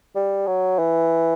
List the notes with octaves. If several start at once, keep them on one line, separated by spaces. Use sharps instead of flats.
G3
F#3
E3